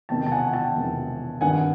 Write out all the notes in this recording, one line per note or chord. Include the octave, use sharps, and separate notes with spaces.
E1 E2 C3 D#3 G5 A5
A5
F#5 G#5
G5 A5
E1 E2 C3 D#3
G#1 G2 D#3 F#5 G#5